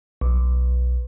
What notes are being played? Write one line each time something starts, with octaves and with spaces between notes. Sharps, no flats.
B1